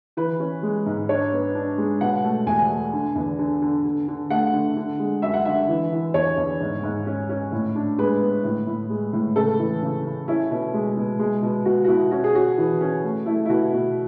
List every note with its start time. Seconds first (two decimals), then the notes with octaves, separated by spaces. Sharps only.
0.17 E3 B4
0.40 C#4
0.63 G#3
0.86 G#2
1.09 D4 C#5
1.32 B3
1.55 D4
1.78 G#3
2.01 B2 F#5
2.24 A3
2.47 E2 G#5
2.70 A3
2.93 D3
3.15 E2
3.39 D3
3.62 D3
3.85 D3
4.08 D3
4.30 A3 F#5
4.53 D3
4.77 D3
4.99 G#3
5.22 F#2 E5
5.34 F#5
5.45 D3 E5
5.69 E3
5.92 E3
6.14 E2 C#5
6.37 E2
6.61 G#2
6.83 G#2
7.06 C#4
7.29 C#4
7.52 A2
7.75 D4
7.98 G#3 B4
8.21 B3
8.44 A2
8.67 A2
8.90 G#3
9.13 A2
9.36 C#3 A4
9.59 E3
9.82 C#3
10.05 C#3
10.28 C#4 E4
10.51 B2
10.74 G#3
10.97 B2
11.19 G#3
11.42 B2
11.65 B2 F#4
11.84 F#4
11.88 B2 E4
12.11 C#4 F#4
12.24 G#4
12.34 C#4 F#4
12.58 E3
12.81 C#4
13.03 A3
13.26 A3 E4
13.45 E4
13.49 B2 F#4
13.72 B2